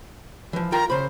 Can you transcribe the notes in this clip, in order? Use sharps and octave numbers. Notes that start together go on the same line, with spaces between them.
E3 F3
F4 A#4 G5 A#5
C#3 C5 B5